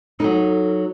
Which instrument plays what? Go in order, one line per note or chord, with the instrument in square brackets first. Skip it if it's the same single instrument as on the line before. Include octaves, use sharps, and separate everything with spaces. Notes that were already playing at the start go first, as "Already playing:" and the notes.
[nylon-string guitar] F#3 D#4 [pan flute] A4